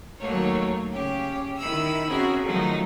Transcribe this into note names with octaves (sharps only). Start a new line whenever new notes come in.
D#2 F#3 A3 A#3 C#5
C#3 C#4 G4
D#3 E4 B5 E6
C4 C#4 F#4 G#4 A#4 E5
D#3 F3 F#3 A3 D#4